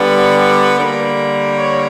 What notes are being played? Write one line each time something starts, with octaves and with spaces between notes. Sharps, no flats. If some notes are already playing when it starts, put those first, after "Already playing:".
Already playing: D3 G3 B3
D5
D3 G3 A#3
C#5